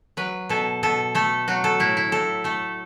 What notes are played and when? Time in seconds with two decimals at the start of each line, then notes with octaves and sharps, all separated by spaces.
0.17 F#3 B4
0.49 B2 A4
0.83 B2 A4
1.15 A3 A4
1.48 F#3 F#4
1.64 A4
1.80 A2 E4
1.97 E4
2.12 A2 A4
2.44 A3 A4